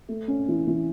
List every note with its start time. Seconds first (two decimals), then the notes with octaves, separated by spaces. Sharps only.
0.09 A3
0.28 C#4
0.49 E3
0.67 E3